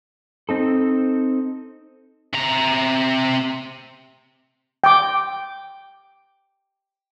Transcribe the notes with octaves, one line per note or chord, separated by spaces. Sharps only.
C4 D#4 A4
C3 A#5
G5 D6